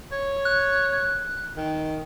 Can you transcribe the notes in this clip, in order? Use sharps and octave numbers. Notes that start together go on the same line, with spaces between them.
C#5
F#6
D#3